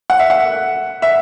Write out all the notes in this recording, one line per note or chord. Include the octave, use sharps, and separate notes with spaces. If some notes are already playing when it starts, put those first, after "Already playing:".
F#5
E5
F#5
E5